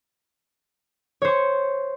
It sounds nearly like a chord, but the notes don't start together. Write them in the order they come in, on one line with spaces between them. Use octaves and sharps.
C#5 C5 C#6